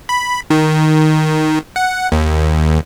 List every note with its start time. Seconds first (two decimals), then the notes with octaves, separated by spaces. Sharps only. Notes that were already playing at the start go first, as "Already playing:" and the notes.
0.09 B5
0.50 D#3
1.76 F#5
2.12 D#2